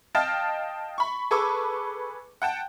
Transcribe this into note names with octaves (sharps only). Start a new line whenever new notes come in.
D#5 F5 G5 A5 F6 A6
B5 C#6
G#4 A4 B4 C#6 D6 E6
F#5 G5 A5